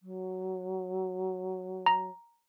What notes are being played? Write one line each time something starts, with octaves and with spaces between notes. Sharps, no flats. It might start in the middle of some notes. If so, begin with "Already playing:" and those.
F#3
A#5